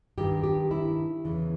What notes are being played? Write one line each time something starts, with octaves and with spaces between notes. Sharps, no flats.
G2 D#3 G4
G4
E4
E2 C#3 E3